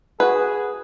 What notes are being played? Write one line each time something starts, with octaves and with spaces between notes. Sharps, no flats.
F#4 G#4 B4